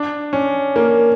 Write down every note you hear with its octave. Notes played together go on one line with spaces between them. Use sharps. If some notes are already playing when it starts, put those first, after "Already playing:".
Already playing: D4
C#4
A#3